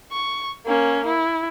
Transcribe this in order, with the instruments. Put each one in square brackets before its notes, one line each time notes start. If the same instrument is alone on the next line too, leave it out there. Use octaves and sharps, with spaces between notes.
[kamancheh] C#6
A#3 C#4
E4